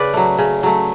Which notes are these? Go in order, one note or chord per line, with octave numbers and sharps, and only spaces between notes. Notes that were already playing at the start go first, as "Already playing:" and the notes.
Already playing: C#3 B4 D5
F#3 A3
C#3
F#3 A3